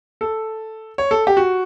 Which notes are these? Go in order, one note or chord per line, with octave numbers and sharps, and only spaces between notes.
A4
C#5
A4
G4
F#4